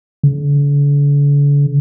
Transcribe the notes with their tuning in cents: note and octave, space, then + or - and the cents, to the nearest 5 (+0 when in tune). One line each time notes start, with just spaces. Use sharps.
D3 -45